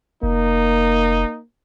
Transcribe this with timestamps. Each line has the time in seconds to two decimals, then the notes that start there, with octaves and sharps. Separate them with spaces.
0.23 F1 A#3 D#4